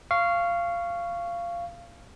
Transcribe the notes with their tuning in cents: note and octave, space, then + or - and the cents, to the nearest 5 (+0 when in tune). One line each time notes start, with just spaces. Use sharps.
F5 -15 C#6 +5